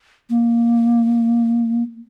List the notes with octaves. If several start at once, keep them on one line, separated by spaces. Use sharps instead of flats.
A#3